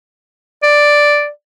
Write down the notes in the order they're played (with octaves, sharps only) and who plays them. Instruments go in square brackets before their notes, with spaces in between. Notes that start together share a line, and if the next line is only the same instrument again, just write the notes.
[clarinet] D5